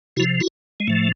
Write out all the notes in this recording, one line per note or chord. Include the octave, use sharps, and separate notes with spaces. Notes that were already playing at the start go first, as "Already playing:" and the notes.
C3 F3 E4 F#4
E4 F#4
G#3
A2 F3 A3